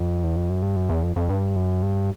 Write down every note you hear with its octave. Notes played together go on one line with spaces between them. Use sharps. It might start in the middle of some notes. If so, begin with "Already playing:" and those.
Already playing: F2
E2
F2
F#2
G2
F#2
E2
F2
F2
G2
F#2
G2